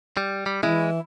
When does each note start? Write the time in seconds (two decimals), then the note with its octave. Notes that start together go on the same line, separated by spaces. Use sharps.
0.17 G3
0.46 G3
0.63 E3 G#3 E4